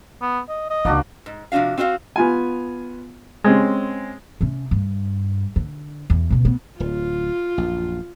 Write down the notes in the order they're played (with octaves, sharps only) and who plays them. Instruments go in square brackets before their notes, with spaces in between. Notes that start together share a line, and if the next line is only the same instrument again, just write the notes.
[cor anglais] B3
D#5
D#5
[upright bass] C#2 [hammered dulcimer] A#3 D4 F#4
[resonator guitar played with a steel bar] G#2
C3 F3 D4 F#4 F5
C4 F#4 C5 D#5 F5
[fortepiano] B3 F4 G#5
G#3 C4 C#4
[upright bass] C3 C#4
G2
D3
E2
C#2 B2
B3
[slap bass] D1 [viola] F4
[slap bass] A#1 F#2